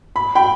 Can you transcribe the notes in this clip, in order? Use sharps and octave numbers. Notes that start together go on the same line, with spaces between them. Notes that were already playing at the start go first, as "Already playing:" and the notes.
B5
G5 B5